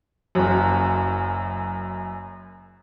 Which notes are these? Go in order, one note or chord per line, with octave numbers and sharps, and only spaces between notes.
F#1 F#2